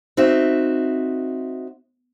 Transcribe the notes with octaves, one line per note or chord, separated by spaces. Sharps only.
C4 D#4 F#4 E5